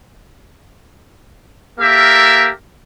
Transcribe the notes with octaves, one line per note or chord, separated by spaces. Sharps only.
A#3 G4 A4 A#4 E5